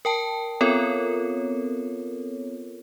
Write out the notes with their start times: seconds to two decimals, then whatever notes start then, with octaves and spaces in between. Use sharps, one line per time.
0.05 A#4 G5 A5
0.61 B3 C4 F4 A4 A#4 C#5